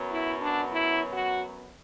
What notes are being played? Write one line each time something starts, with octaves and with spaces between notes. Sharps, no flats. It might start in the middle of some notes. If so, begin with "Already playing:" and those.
Already playing: F#2 F#3 B3
E4
D4
E4
F#4